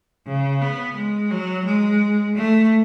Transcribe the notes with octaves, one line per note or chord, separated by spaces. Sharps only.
C#3
B3
G#3
F#3
G#3
A3